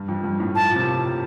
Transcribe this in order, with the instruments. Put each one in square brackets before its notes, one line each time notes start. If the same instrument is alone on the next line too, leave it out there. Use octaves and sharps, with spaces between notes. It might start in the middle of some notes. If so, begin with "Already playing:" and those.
Already playing: [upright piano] G2
F2
G2
A2
[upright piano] A#2 [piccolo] A5
[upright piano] A#2
C3
A#2